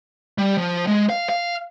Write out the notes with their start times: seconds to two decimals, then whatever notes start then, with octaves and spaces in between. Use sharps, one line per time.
0.38 G3
0.58 F3
0.87 G#3
1.09 F5
1.29 F5